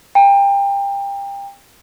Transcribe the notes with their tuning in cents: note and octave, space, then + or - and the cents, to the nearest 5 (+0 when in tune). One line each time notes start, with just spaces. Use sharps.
G5 +25 A#5 -30